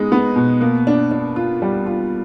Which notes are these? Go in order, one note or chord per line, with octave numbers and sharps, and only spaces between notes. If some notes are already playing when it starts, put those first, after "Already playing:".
Already playing: G#3 B3 D#4
B3
B2
A#3
D4
D4
F4
G3
F4